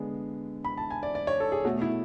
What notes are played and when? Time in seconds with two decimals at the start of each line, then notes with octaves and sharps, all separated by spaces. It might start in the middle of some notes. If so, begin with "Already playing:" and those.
Already playing: D3 G#3 B3
0.65 B5
0.78 A5
0.91 G#5
1.03 D5
1.15 D5
1.27 C#5
1.40 A4
1.52 G#4
1.65 B2 A3 F#4
1.82 E4